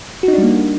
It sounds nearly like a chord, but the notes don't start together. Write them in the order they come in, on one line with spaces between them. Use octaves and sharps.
F#4 D#4 D4 G3 A#3